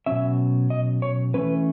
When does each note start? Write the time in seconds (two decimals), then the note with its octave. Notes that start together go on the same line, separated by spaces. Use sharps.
0.06 B2 F#3 C#4 E5
0.70 D#5
1.02 C#5
1.34 E3 A3 C#4 B4